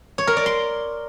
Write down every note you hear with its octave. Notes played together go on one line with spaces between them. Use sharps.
C#5
A#4
D5
C6